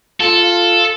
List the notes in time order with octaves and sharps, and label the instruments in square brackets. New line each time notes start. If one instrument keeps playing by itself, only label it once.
[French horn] F4 [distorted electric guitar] A4